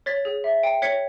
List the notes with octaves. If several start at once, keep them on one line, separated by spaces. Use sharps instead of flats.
C#5 A6 B6
G#4
E5
G5
C#5 B6 C#7